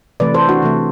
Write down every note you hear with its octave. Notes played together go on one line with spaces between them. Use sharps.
C3 E3 A3 B4 D5
A4 C5
D4 F#4
C3 E3 A3